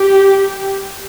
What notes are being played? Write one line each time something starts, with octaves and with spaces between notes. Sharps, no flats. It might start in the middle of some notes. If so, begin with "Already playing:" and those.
Already playing: G4